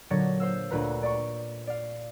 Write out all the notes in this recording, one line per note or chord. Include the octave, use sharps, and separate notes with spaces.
A#2 D3 F#3 C#5 A6 A#6
C5 F5 E6
D2 A#2 B4 A#5
D5 C#6
D5 F5